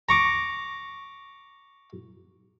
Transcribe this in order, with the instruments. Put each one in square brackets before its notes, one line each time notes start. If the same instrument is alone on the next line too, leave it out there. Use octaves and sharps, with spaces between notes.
[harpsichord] A#5 C#6 D6